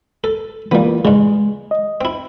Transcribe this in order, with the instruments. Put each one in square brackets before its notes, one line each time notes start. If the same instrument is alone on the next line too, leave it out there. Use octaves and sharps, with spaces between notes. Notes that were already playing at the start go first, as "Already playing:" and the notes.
[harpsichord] A4
[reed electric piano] E3 A#3 F4 [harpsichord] G3 B3
[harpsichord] G2 C#3 [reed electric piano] G#3
[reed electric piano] D#5
[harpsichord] C4 E4